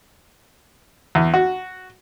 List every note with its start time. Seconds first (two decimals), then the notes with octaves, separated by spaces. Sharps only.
1.15 E2
1.34 F#4